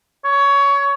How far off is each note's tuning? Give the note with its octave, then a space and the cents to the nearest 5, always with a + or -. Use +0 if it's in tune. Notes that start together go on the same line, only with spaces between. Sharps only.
C#5 +20